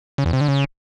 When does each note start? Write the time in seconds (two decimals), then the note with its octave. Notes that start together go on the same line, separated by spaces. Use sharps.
0.18 C#3
0.26 E2
0.33 C3
0.41 D3
0.48 C#3